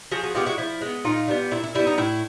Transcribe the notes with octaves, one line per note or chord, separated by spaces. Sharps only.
F3 F#4 G#4
F#4 G#4
G#3 B3 F4 G4
E4 F#4
F3 E4
G#3 B3
A#2 D#4 F4
G3 B3
A#2 E4
E4
G3 B3 E4
D#4
A2 E4